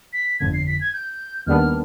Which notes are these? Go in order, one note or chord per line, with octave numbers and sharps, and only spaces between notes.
B6
G1 F2 D3 G#6
C7
B6
G#6
G6
D#2 D#3 G3 B3 D4 F6